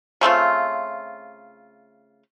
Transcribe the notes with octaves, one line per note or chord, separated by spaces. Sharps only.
C#3 A3 C4 F4